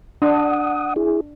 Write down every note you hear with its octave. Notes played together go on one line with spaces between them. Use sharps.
D4 F#5 D#6
E4 G#4